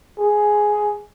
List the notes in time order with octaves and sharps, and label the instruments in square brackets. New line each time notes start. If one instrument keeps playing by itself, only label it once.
[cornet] G#4